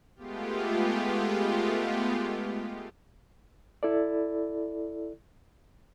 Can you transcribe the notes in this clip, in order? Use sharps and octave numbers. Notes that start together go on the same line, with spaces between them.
G#3 A3 B3 F4 G4
E4 A4 D5